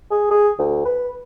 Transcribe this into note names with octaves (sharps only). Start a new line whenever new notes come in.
G#4
G#4
D2
B4